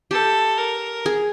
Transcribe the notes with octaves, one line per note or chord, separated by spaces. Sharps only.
G4 A4
A#4
G#4